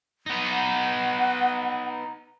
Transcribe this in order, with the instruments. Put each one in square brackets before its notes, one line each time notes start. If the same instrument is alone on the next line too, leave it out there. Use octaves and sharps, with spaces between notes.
[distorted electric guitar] B3 D#4
[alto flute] F#5